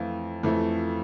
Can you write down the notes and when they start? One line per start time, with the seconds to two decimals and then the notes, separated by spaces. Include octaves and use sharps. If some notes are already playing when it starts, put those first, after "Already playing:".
Already playing: F2 E3 A3 F4
0.43 F2 E3 A3